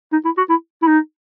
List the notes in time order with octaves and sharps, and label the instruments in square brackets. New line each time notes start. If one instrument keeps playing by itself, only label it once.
[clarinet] D#4
E4
F#4
E4
E4
D#4